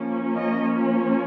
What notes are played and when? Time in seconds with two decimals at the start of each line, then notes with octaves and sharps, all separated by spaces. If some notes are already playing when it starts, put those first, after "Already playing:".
Already playing: F3 A#3 C#4
0.36 D#5